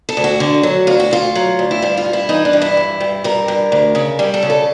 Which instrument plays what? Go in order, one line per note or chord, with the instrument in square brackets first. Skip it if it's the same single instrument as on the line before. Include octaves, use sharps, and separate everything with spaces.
[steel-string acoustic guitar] A4
D2
F#4
D3
F#3
D2 F4
F#4
D2 F4
F#3
D2
E4
G2 F4
F4
G2
E4
E3 D#4
D4
G2
E4
G2
G2
G2 A#4
G2
D2
C#3
G3
A4
C#3
A4